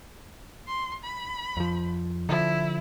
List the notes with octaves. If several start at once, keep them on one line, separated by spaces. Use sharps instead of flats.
C6
B5
F2 F3
D3 E3 F3 E4